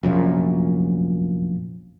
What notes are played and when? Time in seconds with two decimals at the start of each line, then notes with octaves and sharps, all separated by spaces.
0.03 F1 A#1 F#2 A#2